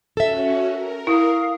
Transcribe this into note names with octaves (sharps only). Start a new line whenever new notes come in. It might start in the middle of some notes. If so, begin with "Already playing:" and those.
C#4 F#4 A4 E5
A#4
E4 F5 D#6